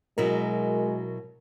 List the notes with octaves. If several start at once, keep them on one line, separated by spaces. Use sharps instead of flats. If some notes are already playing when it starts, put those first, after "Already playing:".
B2 F#3 G#3 E4 A#4